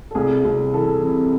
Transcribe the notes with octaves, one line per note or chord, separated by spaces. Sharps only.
A4
C2 G#4
C2
E3 A4
C3